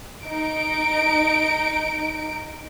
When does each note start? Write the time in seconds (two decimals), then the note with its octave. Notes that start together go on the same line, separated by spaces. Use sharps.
0.24 D#4 D7